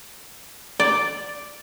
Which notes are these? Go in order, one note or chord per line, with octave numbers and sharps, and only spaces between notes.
D5